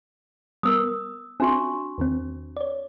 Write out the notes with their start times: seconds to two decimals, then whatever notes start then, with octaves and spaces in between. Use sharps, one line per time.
0.63 G3 B3 A#4 D#6 E6
1.40 C4 D4 F#4 E5 C#6
1.98 E2 D#3 C4
2.57 C#5 D5